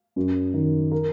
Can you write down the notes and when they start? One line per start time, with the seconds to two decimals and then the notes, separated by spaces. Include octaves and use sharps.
0.16 F#2
0.54 D#3
0.92 A#4